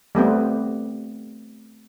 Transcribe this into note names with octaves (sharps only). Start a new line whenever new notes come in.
G3 A3 B3 C4